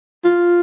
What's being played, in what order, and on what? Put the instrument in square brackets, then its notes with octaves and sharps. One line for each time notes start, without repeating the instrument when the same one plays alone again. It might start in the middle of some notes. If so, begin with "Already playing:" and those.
[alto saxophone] F4